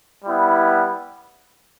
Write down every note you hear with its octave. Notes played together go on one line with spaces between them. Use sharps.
G3 B3 E4